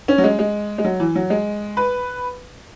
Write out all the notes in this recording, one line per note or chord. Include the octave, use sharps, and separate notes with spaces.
C#4
F#3
G#3
G#3
G#3
F#3
E3
F#3
G#3
B4